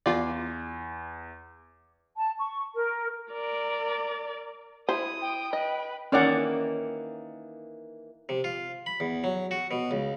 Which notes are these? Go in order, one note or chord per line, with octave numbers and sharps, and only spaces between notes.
E2 F4 D5
A5
C#6
A#4
A#4 D5
E4 C5 D#6
G5
B4 D#5
D#3 E3 A#3 C#4 D5 F#5
C3
F4
B5
E2
F#3
F#4
B2
C#2